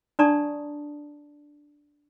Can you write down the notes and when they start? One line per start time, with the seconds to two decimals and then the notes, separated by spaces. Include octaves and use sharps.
0.19 D4 D5 A5 A#5 C#6 D#6